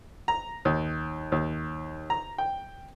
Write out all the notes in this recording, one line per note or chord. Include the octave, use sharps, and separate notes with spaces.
A#5
D#2
D#2
A#5
G5